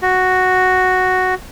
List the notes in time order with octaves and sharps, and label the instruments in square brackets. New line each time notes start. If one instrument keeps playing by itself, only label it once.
[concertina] F#4